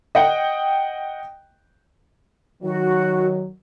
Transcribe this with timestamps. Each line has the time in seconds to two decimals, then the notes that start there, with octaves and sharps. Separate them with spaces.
0.15 D#5 F#5 G5
2.63 D#3 F#3 F#4